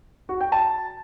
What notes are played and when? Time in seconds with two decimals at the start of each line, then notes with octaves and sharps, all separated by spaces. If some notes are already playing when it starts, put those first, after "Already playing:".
0.29 F#4
0.41 G5
0.52 A5